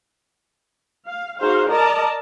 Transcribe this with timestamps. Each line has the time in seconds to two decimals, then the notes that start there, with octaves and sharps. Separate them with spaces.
1.06 F5
1.38 D#4 F#4 G#4 C5 F5
1.70 A#4 D5 D#5 A5 A#5